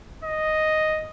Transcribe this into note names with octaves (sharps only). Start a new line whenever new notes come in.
D#5